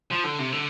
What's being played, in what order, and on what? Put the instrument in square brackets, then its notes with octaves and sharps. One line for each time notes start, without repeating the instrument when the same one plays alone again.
[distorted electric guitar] F3
D3
C3
D3